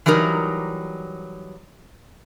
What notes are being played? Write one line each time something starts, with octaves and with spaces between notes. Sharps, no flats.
E3 F#3 G3 D#4 A#4